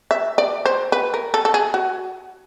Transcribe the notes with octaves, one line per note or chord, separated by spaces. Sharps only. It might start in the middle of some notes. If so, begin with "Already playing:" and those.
E5
D5
C5
B4
A#4
A4
A4
G#4
F#4